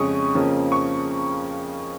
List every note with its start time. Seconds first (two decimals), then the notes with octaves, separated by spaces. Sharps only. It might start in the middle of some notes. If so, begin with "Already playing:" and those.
Already playing: F2 C#3 G#3 C#4 C#6 D#6
0.35 F2 C#3 F3 A#3 C#4
0.72 C#6